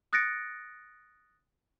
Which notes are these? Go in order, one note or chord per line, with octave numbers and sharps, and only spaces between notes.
D#6 F#6 A6 A#6 C#7 D7